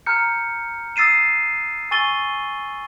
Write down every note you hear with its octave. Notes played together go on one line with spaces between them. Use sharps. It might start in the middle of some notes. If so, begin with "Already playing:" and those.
A#5 F6 G6 C#7
D#6 E6 A6 C7 D#7 E7
G#5 C#6 E6 A6 D#7 G7